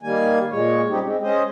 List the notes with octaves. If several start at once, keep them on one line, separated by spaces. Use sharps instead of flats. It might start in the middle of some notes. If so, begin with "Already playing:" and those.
D#3 G3 A#3 G#5
A#2 G#3 C#5
C#3 G3 C4 D#4 G4
G#3 C4
G#3 C#4 C5 D#5